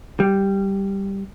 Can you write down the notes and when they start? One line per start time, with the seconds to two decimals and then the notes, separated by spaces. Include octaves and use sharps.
0.20 G3